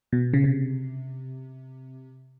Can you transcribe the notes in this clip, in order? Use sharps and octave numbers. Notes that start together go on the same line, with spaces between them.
B2
C#3
C3